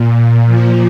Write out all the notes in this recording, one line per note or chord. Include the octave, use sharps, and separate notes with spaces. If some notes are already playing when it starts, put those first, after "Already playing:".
Already playing: A#2
F3